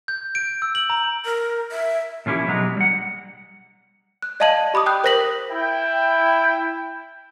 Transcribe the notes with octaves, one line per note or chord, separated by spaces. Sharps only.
G6
D7
E6
F#7
A#5
A#4
E5
A#2 F3 C#4 E4 G4
B2 F#3 G#3 D4 A#5
G3 F#5
F#6
D5 D#5 F5 A5 G#6 F#7
G4 B5 D6 D#6
G5 D#6 F#6 G6
A#4 C5 G6 A#6 B6 F#7
E4 G5